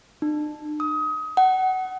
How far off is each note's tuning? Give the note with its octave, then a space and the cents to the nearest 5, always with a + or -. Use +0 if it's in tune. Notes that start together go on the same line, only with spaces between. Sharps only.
D4 +45
D#6 +25
F#5 +25